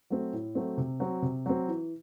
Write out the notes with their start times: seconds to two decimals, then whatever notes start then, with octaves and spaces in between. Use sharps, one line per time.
0.10 F#3 A3 C4
0.33 A2
0.55 F#3 A3 C4
0.78 C3
1.00 F#3 C4
1.22 C3
1.46 F#3 C4
1.68 E3